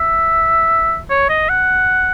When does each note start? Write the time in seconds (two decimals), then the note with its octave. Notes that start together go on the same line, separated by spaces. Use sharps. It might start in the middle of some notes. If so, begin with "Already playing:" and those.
Already playing: E5
1.10 C#5
1.29 D#5
1.49 F#5